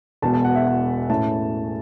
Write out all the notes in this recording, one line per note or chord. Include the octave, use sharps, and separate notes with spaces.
E1 E2 B2 A5
A5
F#5
E5
F#5
A2 A3 C#4 E4 A5